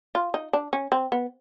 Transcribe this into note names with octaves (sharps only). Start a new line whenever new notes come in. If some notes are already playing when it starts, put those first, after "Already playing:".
F4
D#4
D4
C#4
C4
B3